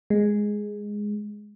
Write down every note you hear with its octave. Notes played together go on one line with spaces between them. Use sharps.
G#3